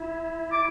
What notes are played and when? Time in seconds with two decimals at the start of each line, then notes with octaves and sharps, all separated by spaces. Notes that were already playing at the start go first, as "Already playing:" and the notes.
Already playing: E4
0.52 D6